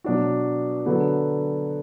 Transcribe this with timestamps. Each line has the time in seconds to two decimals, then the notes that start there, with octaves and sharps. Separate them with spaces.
0.04 B2 F#3 D4 F#4
0.86 D3 F#3 B3